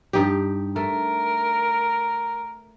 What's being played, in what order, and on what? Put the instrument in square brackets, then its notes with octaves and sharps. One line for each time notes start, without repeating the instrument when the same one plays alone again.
[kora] G2 D#4 G4
[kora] A3 [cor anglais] A#4